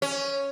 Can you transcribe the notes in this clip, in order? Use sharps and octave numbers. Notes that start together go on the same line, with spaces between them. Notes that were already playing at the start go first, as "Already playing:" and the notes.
C#4